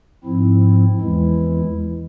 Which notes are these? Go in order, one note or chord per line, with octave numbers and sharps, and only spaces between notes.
G#2 F3 C4 E4
E2 E3 G#3 E4